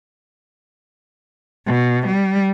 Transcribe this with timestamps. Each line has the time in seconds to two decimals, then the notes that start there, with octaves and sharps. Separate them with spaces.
1.66 B2
2.07 G3